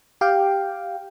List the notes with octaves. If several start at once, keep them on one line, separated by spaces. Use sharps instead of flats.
G4 F5 G5